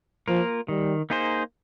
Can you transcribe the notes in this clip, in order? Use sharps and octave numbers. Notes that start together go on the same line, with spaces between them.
F3 A#3 F4 A#4
D#3 G3
A#3 D#4 G#4 C5